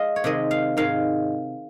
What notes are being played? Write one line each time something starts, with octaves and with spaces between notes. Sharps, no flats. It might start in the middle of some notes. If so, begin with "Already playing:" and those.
Already playing: G#3 D#5 F5
C#5
C3 D#3 G#3 D#5
F5
G#2 D#3 G#3 F5